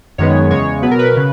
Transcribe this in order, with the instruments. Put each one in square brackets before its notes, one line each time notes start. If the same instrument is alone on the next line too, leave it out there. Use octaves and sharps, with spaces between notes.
[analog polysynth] F#2 D#3 G#3 B3 C#5
E2 C#3 G#3 C#5
B2 F#3 B3 B4
A#4
B4
C#3